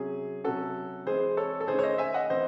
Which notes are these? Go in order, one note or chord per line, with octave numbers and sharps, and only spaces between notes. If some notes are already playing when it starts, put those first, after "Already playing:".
Already playing: C3 F#3 C#4 G#4
C3 F#3 C#4 F#4 A4
E3 G#3 C4 G#4 C5
A4 C#5
A4
D#3 A3 C#4 G#4 C5
C#5
C5 D#5
E5 G#5
D#5 F#5
E3 C4 C5 D#5